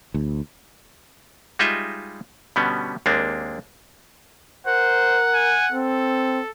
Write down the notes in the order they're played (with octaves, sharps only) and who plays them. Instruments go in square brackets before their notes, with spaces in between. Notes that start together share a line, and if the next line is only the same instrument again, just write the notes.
[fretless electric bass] D2
[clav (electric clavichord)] G3 G#3 D#4 F4 D#5 E5
B2 D3 G3 B3 C#4
D#2 G#3 A#3 C4 D4
[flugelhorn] A#4 [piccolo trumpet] C5 [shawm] F#5
[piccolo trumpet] G#5
[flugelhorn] C4 [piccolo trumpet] A4